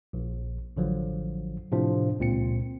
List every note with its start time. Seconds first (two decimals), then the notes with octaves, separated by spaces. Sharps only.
0.13 A#1
0.76 A1 D3 F3 F#3
1.72 A2 C3 F3 D4
2.19 C#2 A#2 C4 C#7